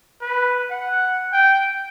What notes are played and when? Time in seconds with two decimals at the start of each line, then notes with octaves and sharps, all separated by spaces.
0.21 B4
0.71 F#5
1.33 G5